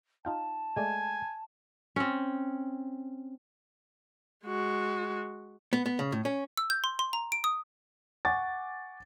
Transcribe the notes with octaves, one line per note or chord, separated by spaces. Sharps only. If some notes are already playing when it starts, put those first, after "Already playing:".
D#4 F4 G5 A5
G#3 A3 D5 G#5
C4 C#4
G#3 F#4
B3
B3
C#3
A2
C#4
E6
G6
C6
C6
A#5
D7
D#6
F#5 G#5 C#6 D6 A6